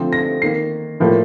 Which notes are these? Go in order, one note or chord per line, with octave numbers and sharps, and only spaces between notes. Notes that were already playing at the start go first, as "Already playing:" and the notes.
Already playing: D3 F3 A3 C4
A#6
D#3 A#3 C7
A2 F3 A#3